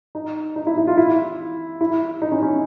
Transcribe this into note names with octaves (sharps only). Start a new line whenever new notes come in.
D#4
D#4
E4
E4
F4
E4
E4
D#4
C#4
C#4